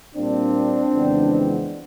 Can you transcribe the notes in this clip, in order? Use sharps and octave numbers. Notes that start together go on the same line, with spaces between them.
A#2 G3 A#3 C4 D4
F2 C#3 E3 G#3 B3